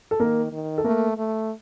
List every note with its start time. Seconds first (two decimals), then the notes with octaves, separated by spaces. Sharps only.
0.11 A4
0.20 D#3 A#3 A#4
0.52 D#3
0.78 A4
0.84 A3 A#3 A#4
1.17 A3